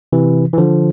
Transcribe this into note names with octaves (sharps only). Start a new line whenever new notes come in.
C3 E3
E3
D3 F3